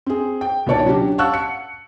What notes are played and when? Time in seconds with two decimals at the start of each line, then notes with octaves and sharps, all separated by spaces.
0.06 C4 G#4
0.41 G5
0.66 C#2 B2 D#3 C#5 D5 A5
0.86 F#3 C#4 D4 F#4 G4
1.18 F5 F#5 A5 C#6 E6 F#6
1.34 C#7